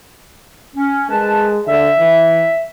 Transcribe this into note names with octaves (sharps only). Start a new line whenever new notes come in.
C#4
G#3 A#4 B4 A5
D3 E5
E3